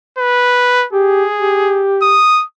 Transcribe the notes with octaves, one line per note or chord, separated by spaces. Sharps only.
B4
G4 G#4
G4
D#6